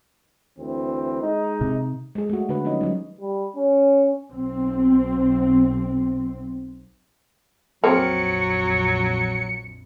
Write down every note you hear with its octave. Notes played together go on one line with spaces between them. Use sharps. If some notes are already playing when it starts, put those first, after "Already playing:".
D2 E3 C4
G#3 D#4
C3
G#3 G#4
A3 F#4
D3 F#4 G#4 B4
F3 F#3 C#4 D#4 D#5
F#3 G3
G3
C#4
B1 C4
A#1 F2 F#3 A#3 C4 C#7